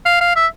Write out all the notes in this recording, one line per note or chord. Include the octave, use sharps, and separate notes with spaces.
F5
F5
E5